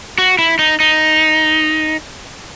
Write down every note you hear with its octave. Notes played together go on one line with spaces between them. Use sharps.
F#4
E4
D#4
D#4